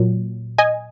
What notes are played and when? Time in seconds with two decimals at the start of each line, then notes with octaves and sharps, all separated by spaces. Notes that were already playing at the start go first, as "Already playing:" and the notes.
Already playing: A#2 F#3
0.58 D#5 G#5